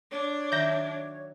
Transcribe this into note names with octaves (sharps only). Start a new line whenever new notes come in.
D4 C#5
D#3 F#3 E5 G6 A#6